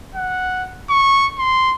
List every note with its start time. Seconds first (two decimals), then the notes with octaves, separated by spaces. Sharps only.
0.15 F#5
0.90 C#6
1.39 C6